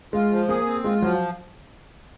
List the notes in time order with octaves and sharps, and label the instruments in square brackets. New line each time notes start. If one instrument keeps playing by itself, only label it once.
[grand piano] G#3 [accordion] F4
[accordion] F3
[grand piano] A#3 [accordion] G#4
[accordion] C4
[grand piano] G#3 [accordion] F4
[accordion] F3 [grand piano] F#3